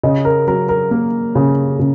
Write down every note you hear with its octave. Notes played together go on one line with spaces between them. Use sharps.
C#3 D#5
A#4
F#3 A#4
A#4
A#3
C#3
C#3